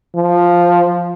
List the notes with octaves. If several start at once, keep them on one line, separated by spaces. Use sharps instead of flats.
F3